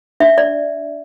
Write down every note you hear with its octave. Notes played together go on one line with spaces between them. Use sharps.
D4 E5
D5